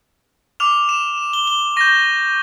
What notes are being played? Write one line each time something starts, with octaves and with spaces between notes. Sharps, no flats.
D6 F6 F7
E7
E7
G7
G7
C#6 G6 A#6